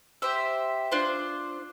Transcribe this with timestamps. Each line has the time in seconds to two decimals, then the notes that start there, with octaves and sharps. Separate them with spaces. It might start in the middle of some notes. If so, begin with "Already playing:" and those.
0.22 G4 C5 E5
0.92 D4 F4 C5